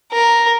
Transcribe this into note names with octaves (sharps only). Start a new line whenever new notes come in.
A#4